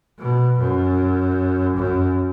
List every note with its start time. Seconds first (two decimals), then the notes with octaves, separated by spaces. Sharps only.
0.19 B2
0.59 F#2
1.77 F#2